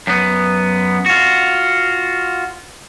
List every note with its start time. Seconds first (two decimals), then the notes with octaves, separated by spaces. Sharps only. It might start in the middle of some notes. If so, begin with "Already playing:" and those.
0.07 F#2 B3
1.06 F4 F#4